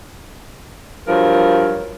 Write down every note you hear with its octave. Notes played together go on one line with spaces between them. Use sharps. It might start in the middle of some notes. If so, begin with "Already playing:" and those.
G2 F3 F#3 A#4